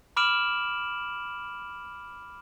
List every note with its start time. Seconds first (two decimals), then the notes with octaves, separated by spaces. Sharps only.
0.17 B5 D6 F6 D7 E7 F#7